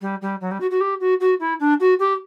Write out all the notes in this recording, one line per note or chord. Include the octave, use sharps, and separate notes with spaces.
G3
G3
F#3
G3
F#4
F#4
G4
F#4
F#4
E4
D4
F#4
G4